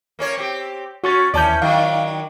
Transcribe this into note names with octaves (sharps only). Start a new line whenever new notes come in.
A#3 C#4 C#5
C4 G4
C#4 F#4 C#6 A6
D#2 E3 C#4 D5 A5 G6
D#3 F#3 D4 F5